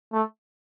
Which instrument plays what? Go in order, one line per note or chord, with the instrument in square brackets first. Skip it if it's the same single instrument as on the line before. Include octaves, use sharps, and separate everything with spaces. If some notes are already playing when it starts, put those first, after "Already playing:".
[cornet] A3